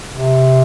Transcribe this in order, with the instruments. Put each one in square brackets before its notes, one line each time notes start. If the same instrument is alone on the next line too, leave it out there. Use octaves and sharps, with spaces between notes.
[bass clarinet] C3